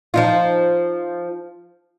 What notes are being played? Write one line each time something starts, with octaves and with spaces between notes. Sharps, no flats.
F3 D#4 F4